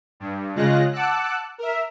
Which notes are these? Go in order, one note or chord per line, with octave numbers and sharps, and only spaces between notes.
G2
C#3 G#3 F4 F#6 A#6
F#5 A5 D6 E6 F#6
A#4 E5